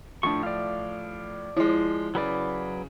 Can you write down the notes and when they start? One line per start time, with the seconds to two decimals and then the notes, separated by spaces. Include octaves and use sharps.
0.23 A2 F3 D4 C#6
0.43 D5 F5
1.57 F3 G#3 E4
2.15 C#3 F#3 B4 D5